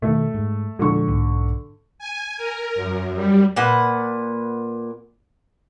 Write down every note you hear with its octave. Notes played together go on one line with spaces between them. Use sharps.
B2 D#3 A3
G#2
A#2 D3 F3 G#3 C#6
B1 G#2
G#5
A#4
F#2
G3
A#2 A#3 B4 F#5